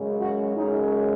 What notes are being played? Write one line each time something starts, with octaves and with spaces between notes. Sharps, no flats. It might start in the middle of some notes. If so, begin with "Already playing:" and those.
Already playing: F#2 C#3 G#3
F#4
F#2 C#3 G#3 D#4